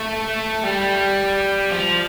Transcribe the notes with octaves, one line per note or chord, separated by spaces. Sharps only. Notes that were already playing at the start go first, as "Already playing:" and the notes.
Already playing: A3
G3
F3